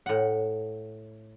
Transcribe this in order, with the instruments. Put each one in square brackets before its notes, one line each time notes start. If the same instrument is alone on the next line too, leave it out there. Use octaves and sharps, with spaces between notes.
[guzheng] A2 F#5